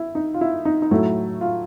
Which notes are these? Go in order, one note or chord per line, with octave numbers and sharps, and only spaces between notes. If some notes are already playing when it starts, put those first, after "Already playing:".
Already playing: E4
D#4
F4
E4
D#4
D#4
A2 F#3 A3 E4
F4